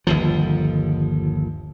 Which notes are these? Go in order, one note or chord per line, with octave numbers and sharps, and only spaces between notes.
G1 D#2 F3